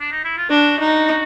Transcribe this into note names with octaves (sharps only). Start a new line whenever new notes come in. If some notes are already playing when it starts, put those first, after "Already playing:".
D4
D#4
E4
F4
D4 F#4
D#4